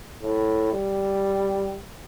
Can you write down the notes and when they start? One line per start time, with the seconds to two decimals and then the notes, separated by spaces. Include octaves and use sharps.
0.22 A2
0.73 G3